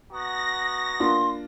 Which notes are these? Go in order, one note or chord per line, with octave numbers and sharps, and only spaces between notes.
B3 D#4 F#4 A#6
A#3 D4 F4 C6